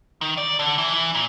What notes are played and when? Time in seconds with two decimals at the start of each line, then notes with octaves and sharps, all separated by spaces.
0.21 D#3
0.37 D5
0.59 D3
0.78 E3
0.94 E3
1.15 A#2